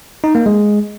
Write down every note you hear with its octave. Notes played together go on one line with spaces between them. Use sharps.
D#4
A#3
G#3